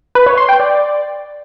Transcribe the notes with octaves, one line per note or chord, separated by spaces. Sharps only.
B4
C#5
C6
G5
D5